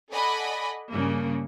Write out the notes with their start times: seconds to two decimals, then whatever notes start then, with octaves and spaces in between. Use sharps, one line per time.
0.12 A4 D5 D#5 F#5 G#5 B5
0.92 G2 C#3 A#3